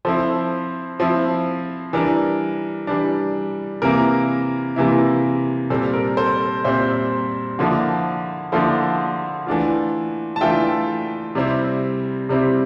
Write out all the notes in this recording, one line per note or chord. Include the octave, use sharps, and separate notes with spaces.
F3 C4 E4 A4 C5
F3 C4 E4
E3 G3 D4 A#4
E3 G3 D4
C3 E3 A#3 E4 A#4
C3 E3 A#3 E4
A#2 G3 C4 A4
A#4
A4 C5
A#2 G3 C4 C5 E5
D3 F3 A#3 E4
D3 F3 A#3 E4 A4 C5
E3 A3 D4 F4
A5
E3 A3 D4 F4 E5 G5
C3 G3 C4 E4
C3 G3 C4 E4